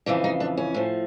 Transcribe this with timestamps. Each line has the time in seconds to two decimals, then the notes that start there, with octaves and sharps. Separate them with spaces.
0.06 F2 C#3 E3 D4
0.24 D#4
0.40 D4
0.58 C#4
0.74 A2 F3